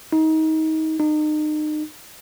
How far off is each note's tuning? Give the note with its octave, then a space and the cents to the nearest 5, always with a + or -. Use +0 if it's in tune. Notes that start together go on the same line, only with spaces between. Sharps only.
D#4 +25
D#4 -35